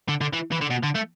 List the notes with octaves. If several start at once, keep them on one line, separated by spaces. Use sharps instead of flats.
D3
D3
E3
E3
D3
B2
D3
A3